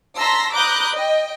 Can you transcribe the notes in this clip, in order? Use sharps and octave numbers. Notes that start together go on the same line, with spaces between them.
A5 A#5 C6 E6 A#6 B6
A#5 B5 D6 D#6 F#6 G6
D#5 G5